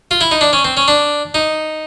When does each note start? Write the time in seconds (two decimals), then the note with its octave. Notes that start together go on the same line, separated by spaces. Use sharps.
0.11 F4
0.21 E4
0.31 D#4
0.41 D4
0.53 C#4
0.64 C4
0.77 C#4
0.88 D4
1.34 D#4